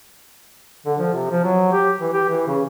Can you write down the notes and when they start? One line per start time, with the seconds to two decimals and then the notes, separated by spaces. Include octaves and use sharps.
0.86 D3
0.99 F3
1.14 C3
1.30 F3
1.44 F#3
1.72 G4
2.01 E3
2.13 G4
2.30 E3
2.47 C#3